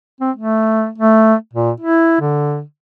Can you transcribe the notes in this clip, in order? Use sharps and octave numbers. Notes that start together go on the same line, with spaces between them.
C4
A3
A3
A#2
E4
D3